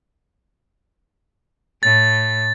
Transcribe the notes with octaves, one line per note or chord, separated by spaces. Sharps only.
A2 A6